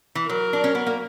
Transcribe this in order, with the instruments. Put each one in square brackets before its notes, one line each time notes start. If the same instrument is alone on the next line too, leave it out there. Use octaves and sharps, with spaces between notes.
[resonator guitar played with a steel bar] E3
[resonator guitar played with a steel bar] F#3 [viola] A#4
[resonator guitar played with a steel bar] D4
C#4
B3
A#3